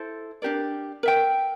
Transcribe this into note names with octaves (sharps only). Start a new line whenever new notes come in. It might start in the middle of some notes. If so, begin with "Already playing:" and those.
Already playing: E4 A4 C5
D4 G4 A#4 D5
A#4 E5 G5